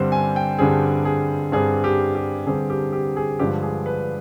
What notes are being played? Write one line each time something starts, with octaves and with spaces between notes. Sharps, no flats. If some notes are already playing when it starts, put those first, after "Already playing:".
Already playing: G2 D3 G3 C4 C5
G#5
G5
G2 D3 G3 C4 G#4
G#4
G2 D3 G3 C4 G#4
G4
G4
G2 D3 G3 C4 G#4
G4
G4
G#4
G2 D3 F3 G#3 G4
G#4
B4